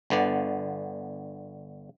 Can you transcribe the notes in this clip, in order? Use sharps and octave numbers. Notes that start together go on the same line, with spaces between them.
G1 D3 B3 D5